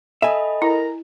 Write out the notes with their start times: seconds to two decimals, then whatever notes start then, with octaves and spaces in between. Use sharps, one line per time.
0.22 A4 D#5 E5 G#5 B5
0.62 E4 A#4 A#5